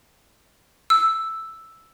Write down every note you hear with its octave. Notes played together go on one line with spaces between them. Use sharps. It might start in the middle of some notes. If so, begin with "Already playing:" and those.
E6